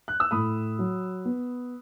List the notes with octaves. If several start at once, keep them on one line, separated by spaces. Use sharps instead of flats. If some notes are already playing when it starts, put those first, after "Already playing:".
F#6
E6
A2 B5 D#6
F#3
B3